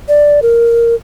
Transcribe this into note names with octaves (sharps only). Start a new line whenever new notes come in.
D5
A#4